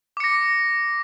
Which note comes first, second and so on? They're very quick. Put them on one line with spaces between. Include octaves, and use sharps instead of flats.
D6 C#7 A#6